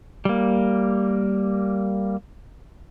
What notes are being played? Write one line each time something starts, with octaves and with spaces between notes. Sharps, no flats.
G3 A#3